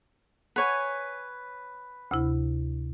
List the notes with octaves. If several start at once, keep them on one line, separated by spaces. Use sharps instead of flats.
B4 C#5 F#5 G#5
D2 C3 E4